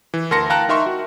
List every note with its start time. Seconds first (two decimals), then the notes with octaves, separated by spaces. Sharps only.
0.14 E3
0.31 D2 A#4 A5 C6 A#6 C#7
0.50 F5 G5 A5 A#5 F#6
0.69 D#4 A#4 E5 C6 C#6
0.86 F#4